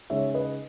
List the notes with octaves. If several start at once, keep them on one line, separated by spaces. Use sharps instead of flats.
C#3 G#3 D#4 C#5 E5
B4 D#5